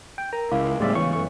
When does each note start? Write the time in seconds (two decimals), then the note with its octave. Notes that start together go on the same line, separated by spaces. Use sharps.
0.18 G5
0.33 A#4 A#5
0.52 C#2 E4 F5 D6
0.80 A2 G3 G#3 B3 D4 D5 E5
0.95 C#2 E3 C#5 C#6
1.13 F#2 A3 C#6